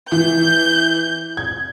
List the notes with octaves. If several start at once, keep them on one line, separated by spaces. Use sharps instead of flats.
E3 G6
G#6